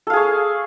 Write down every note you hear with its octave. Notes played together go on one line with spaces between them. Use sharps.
G#4 A4 C#5 F5